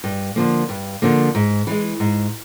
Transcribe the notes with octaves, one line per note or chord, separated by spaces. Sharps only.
G2
D3 F3 A#3
G2
D3 F3 A#3
G#2
E3 G#3
G#2